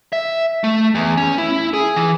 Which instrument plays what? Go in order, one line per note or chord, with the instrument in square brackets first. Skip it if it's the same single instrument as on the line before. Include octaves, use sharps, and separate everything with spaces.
[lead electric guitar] E5
A3
E2
C#4
E4
G#4
E3